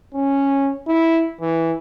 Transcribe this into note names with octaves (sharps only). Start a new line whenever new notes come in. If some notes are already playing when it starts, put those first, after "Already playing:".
C#4
E4
E3